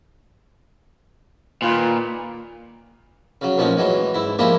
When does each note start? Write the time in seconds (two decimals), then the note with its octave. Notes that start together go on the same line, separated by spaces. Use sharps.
1.62 A#2 D#3 F4 B4
3.41 C#3 F#3
3.57 A1 A#2 F3 C#4 D#4
3.77 E3 F#3 G#3
4.14 G#2 E4
4.39 F3 G#3 A#3 D4 E4 G4